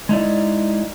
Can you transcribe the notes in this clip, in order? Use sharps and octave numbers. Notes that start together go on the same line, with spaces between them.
G#3 D#4 E4 D5